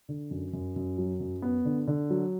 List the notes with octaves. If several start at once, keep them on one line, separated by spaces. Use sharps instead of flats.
D3
F#2
F#2
F#2
F#3
F#2
B3
D3
D3
F#3